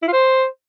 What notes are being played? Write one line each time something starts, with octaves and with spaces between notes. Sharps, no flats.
E4
F4
C5